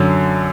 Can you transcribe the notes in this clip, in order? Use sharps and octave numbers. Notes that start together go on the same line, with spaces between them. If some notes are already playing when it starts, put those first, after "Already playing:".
Already playing: F#2 D3 F#3